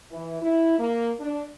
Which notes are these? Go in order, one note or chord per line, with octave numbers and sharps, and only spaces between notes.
E3
E4
A#3
D4